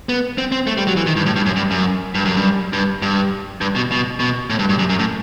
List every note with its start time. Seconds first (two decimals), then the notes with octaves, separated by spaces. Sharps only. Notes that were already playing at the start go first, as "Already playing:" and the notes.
0.09 B3
0.38 C4
0.52 C4
0.67 A3
0.77 G3
0.87 F#3
0.97 E3
1.07 D#3
1.16 G2
1.26 A2
1.36 G2
1.46 F#2
1.56 G2
1.71 F#2
2.15 G2
2.25 F#2
2.37 G2
2.73 G2
3.02 G2
3.61 G2
3.76 B2
3.92 B2
4.20 B2
4.50 A2
4.59 G2
4.69 G2
4.79 F#2
4.89 F#2
4.99 A2